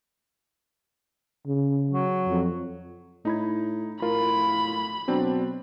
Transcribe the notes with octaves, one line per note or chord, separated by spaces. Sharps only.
C#3
F#3
F2
A2 D#4 B5 G#6
A2 F4 A#4 B5
B2 F#3 C4 D4